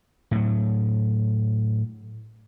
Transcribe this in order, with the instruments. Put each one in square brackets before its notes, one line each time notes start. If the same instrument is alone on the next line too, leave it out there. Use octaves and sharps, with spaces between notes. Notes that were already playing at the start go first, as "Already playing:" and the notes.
[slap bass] A2 F#3